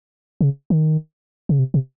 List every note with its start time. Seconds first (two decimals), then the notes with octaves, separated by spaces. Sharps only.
0.41 C#3
0.70 D#3
1.49 C#3
1.59 C3
1.74 C3